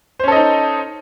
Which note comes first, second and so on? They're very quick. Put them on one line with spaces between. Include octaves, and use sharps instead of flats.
C5 C#4 A4 D#5 D#4